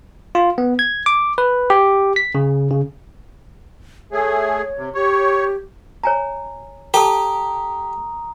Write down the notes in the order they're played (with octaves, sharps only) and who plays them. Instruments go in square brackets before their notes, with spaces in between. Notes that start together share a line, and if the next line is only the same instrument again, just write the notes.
[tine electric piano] F4
B3
G#6
D6
B4
G4
B6
C#3
C#3
[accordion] A3 G#4 [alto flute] C#5
[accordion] C3
[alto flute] G4 [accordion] C#5
[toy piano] C#5 G#5 A#5
[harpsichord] G4 [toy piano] A4 A5 D6 [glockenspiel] A#5 D#6